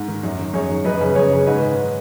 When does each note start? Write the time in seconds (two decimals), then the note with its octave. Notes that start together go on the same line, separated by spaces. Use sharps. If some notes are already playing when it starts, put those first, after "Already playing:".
Already playing: G#2
0.08 D#3
0.24 F#2
0.39 D#3
0.54 F#2 G#4 C#5
0.69 D#3
0.84 F#2 B4 D#5
1.00 C#3
1.15 F#2 G#4 C#5
1.32 C#3
1.46 G#2 B4 D#5
1.62 D#3